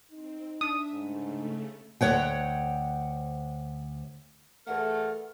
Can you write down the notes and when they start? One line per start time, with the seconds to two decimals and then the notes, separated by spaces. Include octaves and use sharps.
0.11 C4 D#4
0.61 D4 E5 D#6
0.92 G#2 C#3 A3
2.01 D2 G#2 C#5 F#5 G5
4.67 E2 A3 A#4 F#5 F6